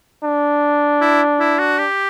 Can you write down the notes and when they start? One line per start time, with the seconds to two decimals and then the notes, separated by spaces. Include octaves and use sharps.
0.24 D4
1.01 E4
1.40 E4
1.59 F#4
1.78 G4